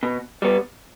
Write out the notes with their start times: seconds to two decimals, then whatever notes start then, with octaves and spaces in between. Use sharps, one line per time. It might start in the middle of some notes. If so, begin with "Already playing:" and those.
0.03 B2
0.42 G3 B3